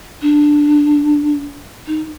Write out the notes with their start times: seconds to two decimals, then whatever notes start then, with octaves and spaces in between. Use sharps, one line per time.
0.22 D4
1.87 D#4